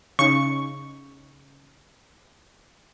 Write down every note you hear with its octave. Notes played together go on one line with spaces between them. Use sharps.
C#3 D#4 C#6